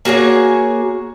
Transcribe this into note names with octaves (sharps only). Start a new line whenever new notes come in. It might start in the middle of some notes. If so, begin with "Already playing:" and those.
A#3 F#4 G#4 C#5